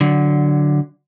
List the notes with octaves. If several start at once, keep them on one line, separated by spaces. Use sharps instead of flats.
D3 F#3